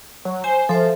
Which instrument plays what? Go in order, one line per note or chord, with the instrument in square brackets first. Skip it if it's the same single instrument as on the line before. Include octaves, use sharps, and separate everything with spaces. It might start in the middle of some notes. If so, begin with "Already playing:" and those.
[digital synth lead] F#3
[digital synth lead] C5 [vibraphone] G#5
[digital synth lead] F3 [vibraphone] A4 C5 E5